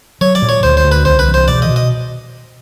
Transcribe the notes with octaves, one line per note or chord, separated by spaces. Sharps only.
F#3 C#5
D5
A#2
C#5
D2 C5
C5
D3
B4
C2 C5
B4
E3
C5
B2 D5
D#5
B2
D#5